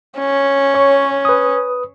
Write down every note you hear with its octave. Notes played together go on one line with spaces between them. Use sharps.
C#4
C#5 C#6
B4 D#6